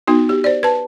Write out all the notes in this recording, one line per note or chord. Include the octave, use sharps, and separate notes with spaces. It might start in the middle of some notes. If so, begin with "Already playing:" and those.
B3 D#4 F#4
G4
C5 D5
B4 A5